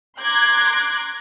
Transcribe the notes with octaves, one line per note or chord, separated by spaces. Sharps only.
A#5 C6 D6 F#6 G#6